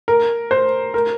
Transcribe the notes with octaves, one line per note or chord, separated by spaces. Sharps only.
A#4
C5
A#4